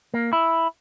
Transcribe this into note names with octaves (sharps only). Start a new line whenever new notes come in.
A#3
E4